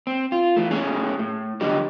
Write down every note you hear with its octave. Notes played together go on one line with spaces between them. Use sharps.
C4
F4
E3 A3
F#2 A3 C#4 G#4
A2
G2 D3 F#3 G4 D#5